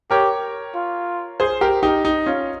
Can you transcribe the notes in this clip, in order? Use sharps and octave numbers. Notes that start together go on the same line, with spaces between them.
G4 A#4 C#5
F4
G#4 C5
G4 A#4
D#4 G4
D#4
C#4 F4